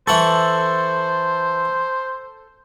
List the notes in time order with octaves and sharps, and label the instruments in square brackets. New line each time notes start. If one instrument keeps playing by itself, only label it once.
[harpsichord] E3 F#5 C#6 [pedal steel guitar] A4 [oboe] C5